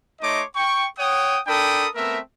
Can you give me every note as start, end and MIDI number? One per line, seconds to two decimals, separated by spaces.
0.21 0.42 57
0.21 0.42 63
0.21 0.42 73
0.21 0.42 75
0.21 0.42 84
0.21 0.42 86
0.55 0.86 79
0.55 0.86 85
0.98 1.38 73
0.98 1.38 78
0.98 1.38 79
0.98 1.38 87
1.46 1.86 62
1.46 1.86 69
1.46 1.86 70
1.46 1.86 79
1.46 1.86 83
1.46 1.86 87
1.95 2.19 57
1.95 2.19 59
1.95 2.19 60
1.95 2.19 70
1.95 2.19 76